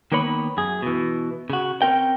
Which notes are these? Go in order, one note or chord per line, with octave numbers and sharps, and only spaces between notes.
D#3 A#3 B3 C#5 B5
F#2 G#4
B2 E3
C#3 F#4
C4 C#4 A#4 G5